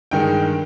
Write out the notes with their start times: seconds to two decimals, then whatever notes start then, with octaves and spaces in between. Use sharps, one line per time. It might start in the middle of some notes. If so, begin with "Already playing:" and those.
0.11 G2 D#3 G#3 G5